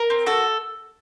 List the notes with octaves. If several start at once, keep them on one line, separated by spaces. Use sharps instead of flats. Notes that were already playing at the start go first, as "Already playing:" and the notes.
Already playing: A#4
C4
F#4 A4